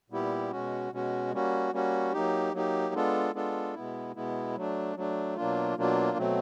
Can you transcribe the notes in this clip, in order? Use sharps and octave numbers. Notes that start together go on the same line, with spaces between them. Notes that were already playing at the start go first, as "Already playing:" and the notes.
A#2 G3 B3 E4 G4
B2 G#3 C#4 F#4
B2 G#3 C#4 F#4
G3 A#3 C#4 F#4
G3 A#3 C#4 F#4
F#3 A#3 D#4 G4
F#3 A#3 D#4 G4
G#3 B3 D4 F4 A4
G#3 B3 D4 F4 A4
B2 G#3 B3 E4
B2 G#3 B3 E4
F#3 A3 D4
F#3 A3 D4
B2 F#3 A#3 D4 F4
B2 F#3 A#3 D4 F4
B2 F#3 A3 C4